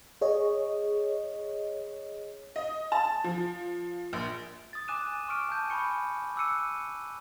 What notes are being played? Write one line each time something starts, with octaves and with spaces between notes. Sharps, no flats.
G#4 C#5 D#5
D#5
A5
F3
A#1
D#6 A6
G#5 D6 F#6 D#7 E7
C#6 D6 F6 D7 D#7
G#5 A5 G6
G#5 B5 C#6 C#7
D6 E6 F#6 C#7 D#7